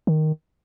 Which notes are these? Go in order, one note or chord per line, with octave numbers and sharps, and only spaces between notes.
D#3